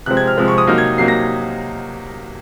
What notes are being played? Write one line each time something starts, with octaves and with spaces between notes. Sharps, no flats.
C3 F3 G#3 C4 F#6
G#6
F6
C3 F3 G#3 C4
C#6
D#6
C3 F#3 A#3 D#4 F6
G#6
C3 F#3 A#3 D#4 C7
A#6